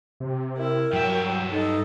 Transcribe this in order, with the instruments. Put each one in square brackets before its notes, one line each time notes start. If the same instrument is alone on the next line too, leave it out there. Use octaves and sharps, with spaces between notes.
[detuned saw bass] C3
[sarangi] E4 [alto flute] A#4
[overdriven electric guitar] G2 E5 [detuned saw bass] F#3 [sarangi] G5
[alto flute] D#4 [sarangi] A4